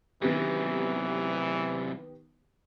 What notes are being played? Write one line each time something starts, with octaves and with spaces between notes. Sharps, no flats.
F#2 C3 D#3 E3 B3 G4